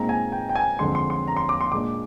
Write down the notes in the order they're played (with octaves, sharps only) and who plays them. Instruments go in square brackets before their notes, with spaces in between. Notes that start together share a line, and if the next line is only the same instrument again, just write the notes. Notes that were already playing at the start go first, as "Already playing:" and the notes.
Already playing: [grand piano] A#2 G#3 C4 D#4 A#5
G#5
G5
G5
G#5
F2 D3 G#3 C6
C6
C6
A#5
C6
D6
C6
A#2 G#3 D4 D6